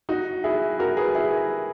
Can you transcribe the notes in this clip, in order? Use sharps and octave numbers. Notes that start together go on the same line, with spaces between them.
D#4 F#4
E4 G#4
F#4 A#4
G#4 B4
E4 G#4